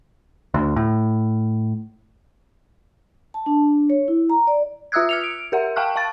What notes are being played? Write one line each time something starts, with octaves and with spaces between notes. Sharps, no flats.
D2
A2
A5
D4
C#5
E4
A#5
D5
F4 E5 D#6 E6 F#6 G#6
F6 C#7 F7
D7
G4 A#4 E5 F#5
F5 G5 A5 C#6 F6 F#6
F5 A5 C#6 A6